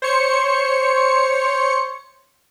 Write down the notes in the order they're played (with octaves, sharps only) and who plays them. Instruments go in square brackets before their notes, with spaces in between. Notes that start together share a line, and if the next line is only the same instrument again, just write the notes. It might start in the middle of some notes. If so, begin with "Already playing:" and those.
[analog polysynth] C5 C#5 C#7